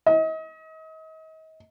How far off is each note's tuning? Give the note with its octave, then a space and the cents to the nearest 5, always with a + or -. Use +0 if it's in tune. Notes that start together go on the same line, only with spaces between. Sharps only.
D#5 +35